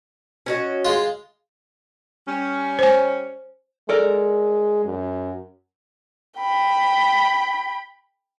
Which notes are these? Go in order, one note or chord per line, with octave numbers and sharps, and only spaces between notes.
C#4 F#4 D#5
G#3 F4
G3 C#4
C5 G#5
G#3 A4 A#4 D5
F#2
G5 B5